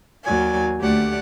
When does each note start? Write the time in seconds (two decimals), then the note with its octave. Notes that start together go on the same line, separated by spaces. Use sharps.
0.23 D#2 F#3 D5 G#5
0.80 D2 A3 G4 D5 F#5